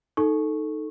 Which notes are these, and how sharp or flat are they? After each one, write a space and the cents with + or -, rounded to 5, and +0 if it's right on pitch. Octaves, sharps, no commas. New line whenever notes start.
D#4 +0 A4 +0 C#6 -10